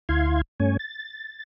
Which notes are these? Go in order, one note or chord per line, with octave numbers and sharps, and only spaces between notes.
D2 E4 F5 C6 G#6
G2 A3 C#4 C#5 G#5
A6